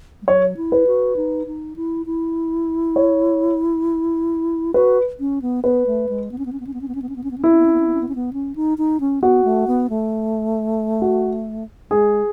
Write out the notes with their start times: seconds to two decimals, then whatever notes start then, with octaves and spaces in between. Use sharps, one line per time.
0.22 G#3
0.27 F#3 C#5
0.57 E4
0.72 B4
0.87 F#4
1.16 D#4
1.47 D#4
1.76 E4
2.06 E4
2.96 C#5
4.74 F#4 B4
5.20 C#4
5.42 B3
5.64 B3 B4
5.86 A3
6.09 G#3
6.31 B3
6.38 C#4
6.46 B3
6.53 C#4
6.60 B3
6.67 C#4
6.74 B3
6.81 C#4
6.88 B3
6.95 C#4
7.02 B3
7.09 C#4
7.16 B3
7.24 C#4
7.31 B3
7.38 C#4
7.44 B3 E4
7.51 C#4
7.59 B3
7.66 C#4
7.73 B3
7.80 C#4
7.87 B3
7.94 C#4
8.01 B3
8.09 C#4
8.15 B3
8.33 C#4
8.56 D#4
8.78 D#4
9.00 C#4
9.22 B3 F#4
9.44 A3
9.67 B3
9.90 A3
11.02 F#4
11.90 G#3 G#4